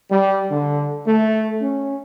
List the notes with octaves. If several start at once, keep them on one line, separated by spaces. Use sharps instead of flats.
G3
D3
A3
C#4